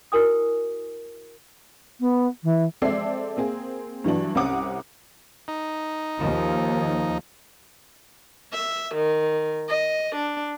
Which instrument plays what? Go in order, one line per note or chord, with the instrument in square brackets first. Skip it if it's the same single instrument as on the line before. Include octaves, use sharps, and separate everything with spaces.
[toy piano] E4 F#4 A#4 G#5 D#6
[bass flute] B3
E3
[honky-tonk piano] G#3 C4 A4 D5 E5 C7
A#3 C4 G#4
G2 E3 F#3 D4
C2 C4 C#4 F#5 D6 D#6
[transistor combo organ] D#4
[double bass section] D#2 [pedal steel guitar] F3
[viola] E5
D#3
D#5
D4